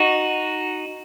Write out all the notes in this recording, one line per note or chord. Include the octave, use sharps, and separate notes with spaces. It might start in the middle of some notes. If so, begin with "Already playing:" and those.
Already playing: D#4 F#4